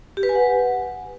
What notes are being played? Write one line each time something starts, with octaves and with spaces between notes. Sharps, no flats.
G4
B4
G#5
F#5